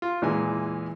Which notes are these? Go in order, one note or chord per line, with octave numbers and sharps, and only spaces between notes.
F4
E2 A#2 E3 G#3 G#5